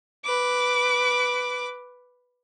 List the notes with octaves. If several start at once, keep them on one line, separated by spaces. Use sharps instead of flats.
B4 D6